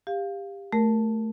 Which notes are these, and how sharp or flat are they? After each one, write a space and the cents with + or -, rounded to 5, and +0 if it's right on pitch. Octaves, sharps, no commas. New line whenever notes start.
G4 +20 F5 +0
A3 +0 A#4 +0